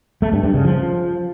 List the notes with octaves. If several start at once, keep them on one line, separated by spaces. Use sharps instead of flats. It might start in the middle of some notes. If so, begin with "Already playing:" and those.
A3
G2
G2
C#3
F3